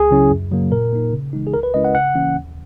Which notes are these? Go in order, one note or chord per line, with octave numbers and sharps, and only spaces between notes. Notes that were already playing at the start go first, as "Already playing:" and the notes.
Already playing: C#2 G#4
C#3 F#3 C#4 E4
F#2
C#3 F#3 A#3
A#2 A#4
A#3 D#4
C#3
E3 G#3 D#4
G#4
C#2 A#4
B4
C#3 G#3 C#4 E4 D#5
F#5
C#3 F#5
E3 A#3 C#4
D#2